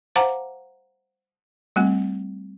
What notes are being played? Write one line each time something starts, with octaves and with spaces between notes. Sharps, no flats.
C5 F5 F#5 A5 A#5 D6
G3 A3 C4